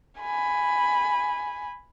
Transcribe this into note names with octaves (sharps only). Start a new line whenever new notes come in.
G#5 B5